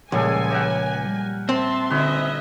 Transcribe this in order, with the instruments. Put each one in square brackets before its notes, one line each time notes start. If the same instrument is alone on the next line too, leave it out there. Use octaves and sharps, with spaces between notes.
[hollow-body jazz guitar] C#2 [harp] A#2 F3 D#6 [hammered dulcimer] G3 G#3 A4 [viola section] G#5
[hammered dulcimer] G4 A#4 F#5 [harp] C#5 E5 E6
[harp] G3
[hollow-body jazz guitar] C4 [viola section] E5 A5 C6
[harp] D3 F#4 [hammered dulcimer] C#4 D#4 B4 [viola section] D#5 E5